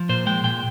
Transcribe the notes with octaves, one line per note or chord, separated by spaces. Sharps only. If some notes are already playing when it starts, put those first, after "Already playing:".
Already playing: F3
A#2 C5
G#3 G5
A#2 G5